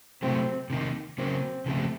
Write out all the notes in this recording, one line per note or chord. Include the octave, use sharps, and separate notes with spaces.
C3 F#3 A3 C4
C3 D#3 A#3 D#4
C#3 F#3 A#3 C4 C#4
C#3 F3 A3 C4